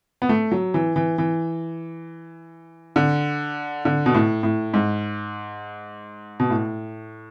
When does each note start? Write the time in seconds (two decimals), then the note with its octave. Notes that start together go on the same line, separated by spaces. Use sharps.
0.22 B3
0.29 A3
0.51 F#3
0.74 E3
0.96 E3
1.18 E3
2.96 D3
3.85 D3
4.06 B2
4.15 A2
4.43 A2
4.74 G#2
6.40 B2
6.50 A2